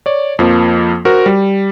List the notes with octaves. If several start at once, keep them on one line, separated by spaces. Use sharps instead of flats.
C#5 D5
F2 F3 A#3
F#4 A#4 C5
G3